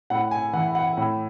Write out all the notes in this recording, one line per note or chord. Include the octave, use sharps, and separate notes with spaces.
A2 F#5
G#5
E3 F#5
F#5
A2